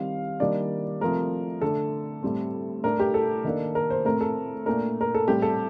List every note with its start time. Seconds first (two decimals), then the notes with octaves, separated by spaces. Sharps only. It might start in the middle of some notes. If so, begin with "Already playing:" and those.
Already playing: D#3 G3 C4 F5
0.40 D#3 G3 A#3 D4 D5
1.01 C3 F3 A3 A#4
1.61 D3 A3 D4 A4
2.23 A2 G3 C4
2.83 A2 A3 D4 A#4
2.99 G4
3.14 A4
3.44 D#3 A#3 D4
3.75 A#4
3.90 C5
4.05 A2 A3 C4 A#4
4.21 A4
4.66 A#2 A3 D4 A#4
5.01 A#4
5.14 A4
5.27 A2 G3 C4 G4
5.42 A4